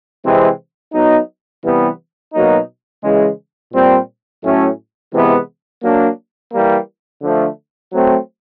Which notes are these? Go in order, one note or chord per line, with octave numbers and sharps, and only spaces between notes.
C3 E3 G#3 C4
F#3 B3 D#4
C3 E3 G3 B3
B2 F#3 A#3 D#4
C#3 E3 G#3
A#2 G3 C4
A2 F#3 A3 C#4
C3 E3 G#3 B3
F#3 A#3 D4
E3 G3 A#3
D3 F3 A3
F#3 A3 C4